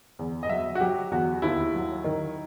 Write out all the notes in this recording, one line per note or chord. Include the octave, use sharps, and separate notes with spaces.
E2
D#5
F#3 E5
F#4
F#3 G4
E2 F#4
D#2 E4
F#3
D#3